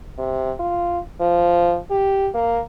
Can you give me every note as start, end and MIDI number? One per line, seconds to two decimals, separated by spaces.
0.18 0.52 48
0.59 0.99 65
1.20 1.78 53
1.91 2.29 67
2.34 2.61 58